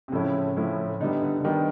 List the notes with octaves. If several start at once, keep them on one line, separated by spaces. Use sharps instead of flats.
C3
A2 C#3 F3 A3 C#4 E4
A2 F3 A3 C#4 E4
D3 G3 B3 D#4
D3
D3
D#3 G3 B3 D#4